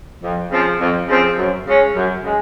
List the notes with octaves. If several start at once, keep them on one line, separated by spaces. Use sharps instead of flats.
F2
C#3 F3 C4
F2
C#3 F3 C4
F#2
C#3 G#3 C#4
F#2
C#3 G#3